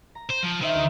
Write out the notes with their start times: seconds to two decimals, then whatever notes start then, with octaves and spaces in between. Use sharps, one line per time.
0.15 A#5
0.30 C5
0.44 F3
0.62 D#3 C5 D#5 E5
0.75 D2